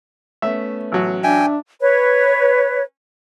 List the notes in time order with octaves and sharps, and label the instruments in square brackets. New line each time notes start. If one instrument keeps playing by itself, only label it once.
[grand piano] A3 B3 C#4 [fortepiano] E5
[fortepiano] A1 F#3
[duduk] D4 [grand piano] E5 [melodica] G5 G#5
[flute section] B4 C#5